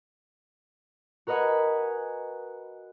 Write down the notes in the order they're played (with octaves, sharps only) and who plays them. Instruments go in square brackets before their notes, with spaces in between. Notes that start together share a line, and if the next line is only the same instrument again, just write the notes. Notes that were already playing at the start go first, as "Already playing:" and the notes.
[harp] F#4 A#4 B4 D#5 F#5 G#5